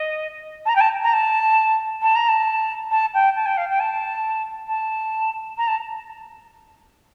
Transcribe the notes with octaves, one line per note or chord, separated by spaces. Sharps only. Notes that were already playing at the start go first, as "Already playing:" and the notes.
Already playing: D#5
A5
A#5
G5
A5
A#5
A5
A5
A#5
A5
A5
G5
A5
G5
F5
G5
A5
A5
A#5
A5